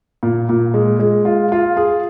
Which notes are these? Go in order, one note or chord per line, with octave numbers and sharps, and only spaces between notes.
A#2
A#2
G#3
G#3
F4
F4
G#4